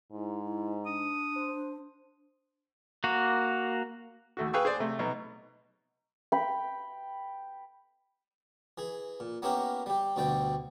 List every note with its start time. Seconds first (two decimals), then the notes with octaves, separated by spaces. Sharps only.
0.12 G#2 E4
0.43 E4
0.86 D4 D#6
1.36 C5
3.04 A#3 F#4
4.37 D#2 A3 F#4
4.53 G#4 B4 F5 G5 C#6 E6
4.65 G#4 C5 D5
4.80 C3 A3
4.99 B2 F#3 D#4
6.32 G5 B5
8.78 E3 G#4
9.20 A#2
9.42 A#3 B3 C#4 E4 G4 A#4
9.86 G3 G4
10.16 D2 B2 D3 G3 D5 G5